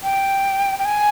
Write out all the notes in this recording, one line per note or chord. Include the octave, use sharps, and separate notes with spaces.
G5
G5
G#5